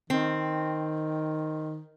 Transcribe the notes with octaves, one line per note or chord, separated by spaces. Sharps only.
D#3 C4